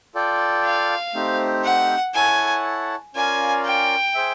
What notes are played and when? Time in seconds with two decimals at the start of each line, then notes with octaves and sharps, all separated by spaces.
0.15 F4 A4 D5 G5
0.65 F5
1.14 A3 C4 D#4 G4 C5
1.65 F#5
2.15 E4 A4 C#5 F#5 G#5 A5
3.14 C#4 F4 A#4 D5 F5 G#5
3.65 G5
4.15 G#4 C5 E5